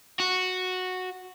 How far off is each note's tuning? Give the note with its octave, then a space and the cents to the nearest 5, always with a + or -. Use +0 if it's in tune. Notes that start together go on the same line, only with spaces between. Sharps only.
F#4 -5